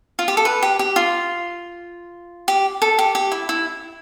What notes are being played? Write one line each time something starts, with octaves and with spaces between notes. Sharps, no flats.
F4
G4
A4
B4
G4
G4
F4
G4
A4
G4
G4
E4
E4